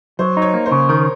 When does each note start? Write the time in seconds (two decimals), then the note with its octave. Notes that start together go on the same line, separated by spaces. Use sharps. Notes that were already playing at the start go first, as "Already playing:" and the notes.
0.19 F#3 C5
0.37 D#4
0.42 C#5
0.54 A#3
0.66 C5
0.72 C#3
0.89 D#3 A#4